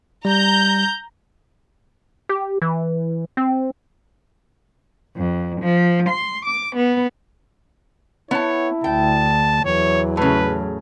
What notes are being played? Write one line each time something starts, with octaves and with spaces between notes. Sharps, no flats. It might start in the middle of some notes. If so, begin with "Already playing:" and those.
G3 A#5 G6
G4
E3
C4
F2
F3
C6
D6
B3
B3 E4 C#5 A5
D2 G5 A5
E2 E3 F#3 C#5
A2 C#3 B4